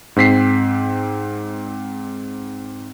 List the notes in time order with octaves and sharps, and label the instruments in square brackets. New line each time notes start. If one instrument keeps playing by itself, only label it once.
[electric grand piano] G#2 C4 B6 C7